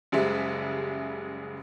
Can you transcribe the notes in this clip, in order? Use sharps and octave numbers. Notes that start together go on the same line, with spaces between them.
F#1 C#3 G3 G#3 E5